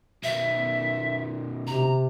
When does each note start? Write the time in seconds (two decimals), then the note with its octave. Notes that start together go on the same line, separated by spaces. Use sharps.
0.23 B2 D#3 E5
1.67 C3 A#5